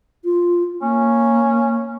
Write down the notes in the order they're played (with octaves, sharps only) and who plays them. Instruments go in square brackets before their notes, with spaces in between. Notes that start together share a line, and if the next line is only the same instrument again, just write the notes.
[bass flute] F4
[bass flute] A#3 [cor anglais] C#4